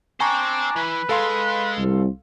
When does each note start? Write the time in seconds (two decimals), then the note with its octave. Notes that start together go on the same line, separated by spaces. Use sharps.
0.20 D4 C5 G5 G#5 A#5 C#6
0.76 E3 B4
1.09 G#3 A4 F5 C6
1.78 C2